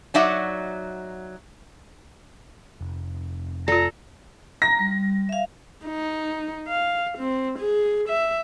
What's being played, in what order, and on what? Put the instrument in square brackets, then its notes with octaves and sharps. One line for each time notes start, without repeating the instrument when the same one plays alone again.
[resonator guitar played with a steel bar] F#3 D#4 F#4 D5 E5 F#5
[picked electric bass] F1
[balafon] F4 D5 [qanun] A4 [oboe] A#5
[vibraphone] A#5 [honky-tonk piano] A#6
[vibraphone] G3
E5 F5
[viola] D#4
F5
C4
G#4
E5